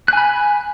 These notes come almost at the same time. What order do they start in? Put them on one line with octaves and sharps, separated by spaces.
F#6 G#5 B5